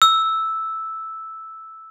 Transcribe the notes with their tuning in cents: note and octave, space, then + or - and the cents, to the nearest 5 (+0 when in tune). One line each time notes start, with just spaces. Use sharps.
E6 -5